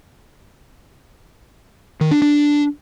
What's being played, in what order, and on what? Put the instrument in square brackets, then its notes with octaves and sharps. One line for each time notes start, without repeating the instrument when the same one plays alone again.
[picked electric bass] D#3
D4
D4